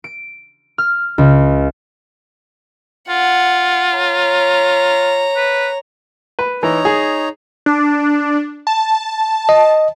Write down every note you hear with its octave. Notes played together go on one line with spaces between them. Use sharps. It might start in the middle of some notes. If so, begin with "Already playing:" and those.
D7
F6
C#2
F4 F#5
C#5 A#5
B4
B4
E3 D#4 C#5 A#5
G#4
D4
A5
D#5